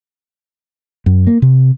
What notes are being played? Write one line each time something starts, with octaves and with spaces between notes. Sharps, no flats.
F#2
A#3
C3